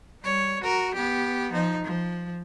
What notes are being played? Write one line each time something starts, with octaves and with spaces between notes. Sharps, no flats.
G3 C#5
F#4 A#4
B3 G4
F3 D#4
F3